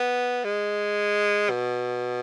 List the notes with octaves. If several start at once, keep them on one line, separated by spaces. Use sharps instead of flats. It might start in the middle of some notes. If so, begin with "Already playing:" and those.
Already playing: B3
G#3
B2